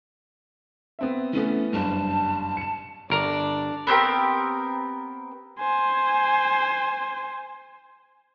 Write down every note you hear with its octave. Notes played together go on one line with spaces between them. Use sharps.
B3 C4 E5
E3 A3 B3 C#4
F#1 G2 A5
C#7 E7
G1 D4 A#4 D5 A#5
B3 C4 G4 A#4
C5 G#5